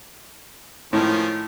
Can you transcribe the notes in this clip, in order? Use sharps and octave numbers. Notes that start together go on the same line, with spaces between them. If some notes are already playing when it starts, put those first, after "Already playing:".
A2 D#3 F3 C#4